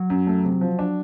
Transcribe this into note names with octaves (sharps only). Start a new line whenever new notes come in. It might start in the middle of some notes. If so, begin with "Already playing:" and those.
Already playing: F#3
F#2
A3
C3
F3
D4